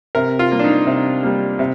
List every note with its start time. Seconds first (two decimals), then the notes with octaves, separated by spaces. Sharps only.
0.15 C3 A#4
0.39 F4
0.52 G3 A#3
0.59 D4
0.64 D#4
0.87 C3
1.23 G3 A#3
1.59 C3